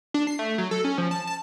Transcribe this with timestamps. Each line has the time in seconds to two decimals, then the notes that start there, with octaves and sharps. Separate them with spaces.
0.14 D4
0.27 C7
0.39 A3
0.58 F#3
0.71 A4
0.84 C#4
0.98 F3
1.11 A5
1.27 A5